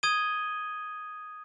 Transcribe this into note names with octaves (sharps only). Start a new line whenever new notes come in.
D#6 G#6 D#7 G7